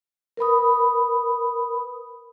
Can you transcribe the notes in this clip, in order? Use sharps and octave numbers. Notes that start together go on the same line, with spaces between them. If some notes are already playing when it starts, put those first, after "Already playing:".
A#4 B4 B5 D#6